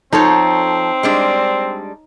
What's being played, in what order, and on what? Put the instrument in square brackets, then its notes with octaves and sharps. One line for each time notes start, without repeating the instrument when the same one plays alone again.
[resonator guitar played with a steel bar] F3 A4 [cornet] C4 [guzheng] D#4 C#5
[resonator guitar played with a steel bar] G3 G#3 D4